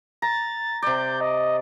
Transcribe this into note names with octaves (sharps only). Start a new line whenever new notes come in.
A#5 A6
C3 D5 G6
D#5